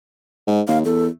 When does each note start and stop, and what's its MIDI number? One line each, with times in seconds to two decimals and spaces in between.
0.47 0.61 44
0.68 0.84 39
0.68 0.78 77
0.85 1.08 40
0.85 1.05 69